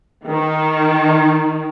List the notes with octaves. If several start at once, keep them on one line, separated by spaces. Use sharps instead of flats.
D#3